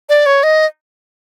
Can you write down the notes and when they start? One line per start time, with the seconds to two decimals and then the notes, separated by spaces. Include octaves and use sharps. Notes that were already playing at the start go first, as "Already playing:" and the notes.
0.09 D5
0.26 C#5
0.43 D#5